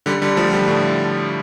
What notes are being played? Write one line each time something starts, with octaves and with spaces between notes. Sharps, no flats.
D3 G3
D3 G3
F3 A3
D3 G3
A2 D3